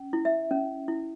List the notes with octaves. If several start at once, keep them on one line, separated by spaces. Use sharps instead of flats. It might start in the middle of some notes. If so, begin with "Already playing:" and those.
Already playing: C#4
E4
E5
C#4
E4